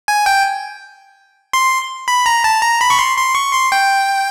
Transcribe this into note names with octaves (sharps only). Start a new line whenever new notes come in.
G#5
G5
C6
B5
A#5
A5
A#5
B5
C#6
C6
C6
C#6
C6
G5